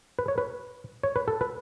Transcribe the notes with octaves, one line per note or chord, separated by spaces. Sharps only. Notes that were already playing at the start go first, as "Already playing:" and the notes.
B4
C#5
B4
C#5
B4
A4
B4